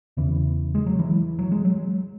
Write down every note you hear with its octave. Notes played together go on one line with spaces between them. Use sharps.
E2 C#3 E3
G#3
F#3
E3
F#3
G#3
F#3